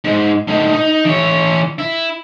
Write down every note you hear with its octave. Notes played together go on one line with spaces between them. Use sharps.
G#2
A2 D#4
D#4
E3 C#5
E4